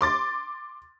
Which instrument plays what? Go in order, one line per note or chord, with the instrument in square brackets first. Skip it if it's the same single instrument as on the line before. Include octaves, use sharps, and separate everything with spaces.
[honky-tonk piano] C6 D6 A6